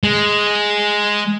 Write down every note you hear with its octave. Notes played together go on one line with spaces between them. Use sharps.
G#3